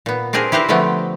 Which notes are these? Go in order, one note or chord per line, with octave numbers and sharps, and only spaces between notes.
A#2 B3
C4 D4 G4 G#4 A#4
E4 G4 B4 C5 A#5
D3 F3 A3 B3 C4